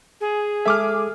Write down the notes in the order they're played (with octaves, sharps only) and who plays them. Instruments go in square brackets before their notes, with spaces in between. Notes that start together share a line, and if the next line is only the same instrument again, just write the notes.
[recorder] G#4
[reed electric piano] G#3 A4 G#5 [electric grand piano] E5 D6 F6